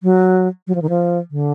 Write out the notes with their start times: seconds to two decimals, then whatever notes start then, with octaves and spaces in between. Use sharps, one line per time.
0.03 F#3
0.67 F#3
0.75 F3
0.82 D#3
0.89 F3
1.31 D3